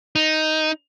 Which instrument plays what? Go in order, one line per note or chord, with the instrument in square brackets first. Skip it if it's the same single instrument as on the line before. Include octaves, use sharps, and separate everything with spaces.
[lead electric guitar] D#4